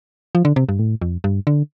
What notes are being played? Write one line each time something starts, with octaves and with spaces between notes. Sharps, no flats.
F3
D3
C3
G2
A2
F2
G2
D3